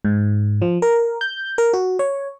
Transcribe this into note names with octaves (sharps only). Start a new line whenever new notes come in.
G#2
F3
A#4
G6
A#4
F#4
C#5